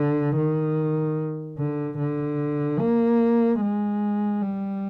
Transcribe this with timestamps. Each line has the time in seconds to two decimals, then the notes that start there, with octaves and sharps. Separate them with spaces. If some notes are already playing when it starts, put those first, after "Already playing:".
Already playing: D3
0.37 D#3
1.58 D3
1.99 D3
2.80 A#3
3.61 G#3
4.42 G3